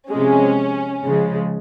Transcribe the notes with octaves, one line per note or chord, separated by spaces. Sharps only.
C3 F3 G#3 C#4
C#3 F3 G#3